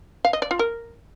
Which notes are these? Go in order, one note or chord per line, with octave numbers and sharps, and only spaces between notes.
F5
D#5
D5
F4
A#4